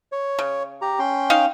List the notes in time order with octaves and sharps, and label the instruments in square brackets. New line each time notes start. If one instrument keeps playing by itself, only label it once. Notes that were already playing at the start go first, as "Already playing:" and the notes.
[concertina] C#5
[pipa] C#3
[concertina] G4 A#5
C#4 G5 C6
[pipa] D#4 F5